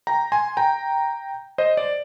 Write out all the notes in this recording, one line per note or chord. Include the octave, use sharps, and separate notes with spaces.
G5 A#5
G#5 C6
G5 A#5
C5 D#5
D5